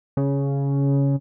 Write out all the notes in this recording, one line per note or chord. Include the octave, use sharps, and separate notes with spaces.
C#3